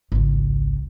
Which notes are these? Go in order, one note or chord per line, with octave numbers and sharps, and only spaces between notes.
G#1 C#2